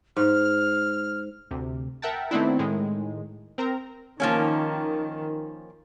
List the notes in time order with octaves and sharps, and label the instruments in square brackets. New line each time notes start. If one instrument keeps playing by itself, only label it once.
[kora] G#2 [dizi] F6
[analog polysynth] D2 C3
A#4 E5 F#5 G5 A5
D#3 A3 B3 C4 D4 E4
A2 D#3 G#3
C4 A#4 A#5
[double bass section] D#3 [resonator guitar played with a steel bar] F3 A#3 C#4